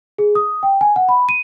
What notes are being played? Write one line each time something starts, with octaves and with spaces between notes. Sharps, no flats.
G#4
D#6
G5
G#5
F#5
B5
D#7